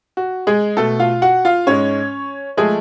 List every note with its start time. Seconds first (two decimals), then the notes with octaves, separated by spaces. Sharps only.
0.17 F#4
0.47 G#3 G#4
0.77 B2 A3 A4
1.00 F4 F5
1.22 F#4 F#5
1.45 F4 F5
1.67 G#2 G#3 C#4 C#5
2.57 F3 G#3 A3 G#4